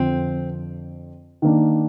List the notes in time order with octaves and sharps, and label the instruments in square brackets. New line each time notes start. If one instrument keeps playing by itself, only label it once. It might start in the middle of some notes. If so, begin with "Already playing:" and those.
Already playing: [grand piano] F2 D3 F3 [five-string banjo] C4
[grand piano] D#3 A#3 D4